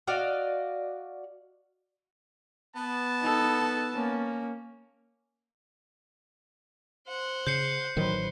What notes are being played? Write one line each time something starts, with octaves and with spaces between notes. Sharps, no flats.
F#4 D5 D#5 F5
B3 A5
D#4 A4
A#3 C#4
C5 F#5
C#3 G6 C7 C#7
A1 D#3 F#3 B4 C5